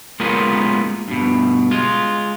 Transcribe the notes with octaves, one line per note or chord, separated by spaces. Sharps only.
G#3 A#3 B3 C#4 F4 A#4
G2 B2
G#3 F4